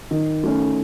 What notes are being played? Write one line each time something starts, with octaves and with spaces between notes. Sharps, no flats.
D#3
A3 C#4